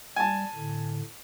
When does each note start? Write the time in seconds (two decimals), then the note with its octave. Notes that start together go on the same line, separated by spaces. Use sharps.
0.16 G3 G#5 A5
0.55 A2 D3